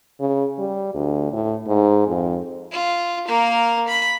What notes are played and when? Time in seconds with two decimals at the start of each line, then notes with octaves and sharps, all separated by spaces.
0.20 C#3
0.59 G3
0.95 D2
1.33 A2
1.67 G#2
2.07 F2
2.72 F4
3.27 A#3 A#4
3.88 B5